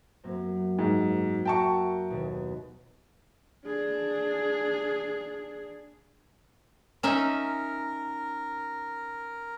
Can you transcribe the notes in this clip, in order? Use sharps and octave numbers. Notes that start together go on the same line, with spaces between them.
F#2 A#3 C4
G#2
F#4 A#4 E5 G5 A5 C#6
D#2 B2 D#3
D4 G#4
C#4 D#4 A#4 E5